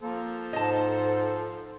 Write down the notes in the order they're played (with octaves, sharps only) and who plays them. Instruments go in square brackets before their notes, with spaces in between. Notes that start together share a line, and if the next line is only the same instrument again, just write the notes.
[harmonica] F3 A4 C5 [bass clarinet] A#3
[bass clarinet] G#2 [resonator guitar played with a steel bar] D#5 A5